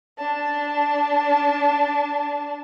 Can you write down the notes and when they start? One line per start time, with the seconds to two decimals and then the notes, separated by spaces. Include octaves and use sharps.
0.18 D4 A5